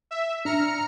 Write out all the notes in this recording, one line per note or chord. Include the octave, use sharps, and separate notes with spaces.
E5
D4 A#5 F6 C#7